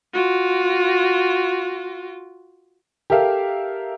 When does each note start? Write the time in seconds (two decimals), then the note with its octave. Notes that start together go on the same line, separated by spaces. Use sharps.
0.13 F4 F#4
3.10 G4 A4 A#4 E5 F5